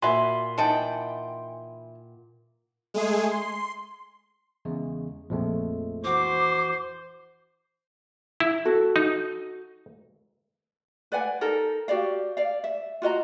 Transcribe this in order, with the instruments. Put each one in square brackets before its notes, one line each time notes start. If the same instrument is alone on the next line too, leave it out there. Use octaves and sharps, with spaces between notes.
[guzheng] A#2 [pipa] F#4 E5 [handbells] G#5 B5 C6
[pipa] E3 D#4 A5 [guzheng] F#5 G5
[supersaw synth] G#3 A3 G#4
C6
[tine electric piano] E2 C#3 G#3
[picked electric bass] A#1 F2 [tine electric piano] F3 G#3 A3
[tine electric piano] E3 F#4 [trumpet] C5 [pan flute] D6
[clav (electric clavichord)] E4
[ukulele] F#4 A4
[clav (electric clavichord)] D#4
[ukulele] B4 D5 F#5 G#5
D#4 A4 A#4
F#4 G4 D5 F5
D5 F5
E5
F4 F#4 D#5 A#5